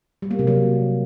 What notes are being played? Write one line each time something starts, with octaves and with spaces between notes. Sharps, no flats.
G3
A#3
C3
F#3